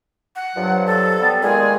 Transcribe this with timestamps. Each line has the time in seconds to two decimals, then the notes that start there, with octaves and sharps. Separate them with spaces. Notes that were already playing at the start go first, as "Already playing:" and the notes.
0.36 F#5
0.56 G2 F3 F#3
0.87 A4
1.20 G3 B3
1.42 A#2 D#3 G#3 G#4